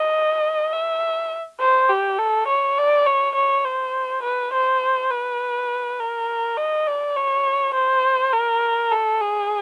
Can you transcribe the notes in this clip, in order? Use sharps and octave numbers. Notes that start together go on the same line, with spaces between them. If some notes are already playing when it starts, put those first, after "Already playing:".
Already playing: D#5
E5
C5
G4
A4
C#5
D5
C#5
C#5
C5
B4
C5
B4
A#4
D#5
D5
C#5
C5
A#4
A4
G#4